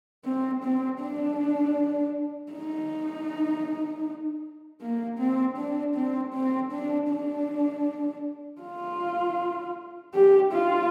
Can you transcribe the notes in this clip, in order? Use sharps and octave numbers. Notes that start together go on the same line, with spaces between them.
C4
C4
D4
D#4
A#3
C4
D4
C4
C4
D4
D4
F4
G4
F4